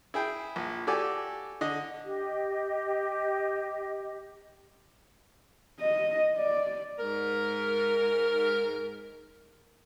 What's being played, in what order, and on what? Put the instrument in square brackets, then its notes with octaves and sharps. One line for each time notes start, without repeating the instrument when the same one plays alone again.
[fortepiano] E4 G#4 G5
A#1
F#4 G4 A4 D5 G#5
D3 D#5
[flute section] G4 D#5
[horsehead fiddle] D#5
D5
[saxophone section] G#2 A#4